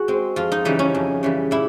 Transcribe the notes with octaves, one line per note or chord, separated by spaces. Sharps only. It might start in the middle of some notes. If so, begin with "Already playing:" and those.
Already playing: F#4 G#4
G#3 C4
F2 F4
D#4
C#3 E3 G3 D#4
C#4
F2
C#3 E3 G3
A#2 E4